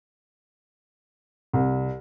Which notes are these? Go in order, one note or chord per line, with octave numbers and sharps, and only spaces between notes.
C2